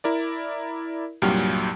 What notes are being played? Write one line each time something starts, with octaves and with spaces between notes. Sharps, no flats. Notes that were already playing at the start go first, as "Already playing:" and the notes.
E4 A#4 D5
C2 G2 A#2 F#3 G4 F6